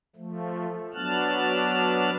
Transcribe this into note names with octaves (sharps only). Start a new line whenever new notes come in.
F3 A3
F#3 B3 D4 A5 F6 F#6